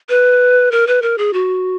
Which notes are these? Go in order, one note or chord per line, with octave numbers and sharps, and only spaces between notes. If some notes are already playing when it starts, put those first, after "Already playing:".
B4
A#4
B4
A#4
G#4
F#4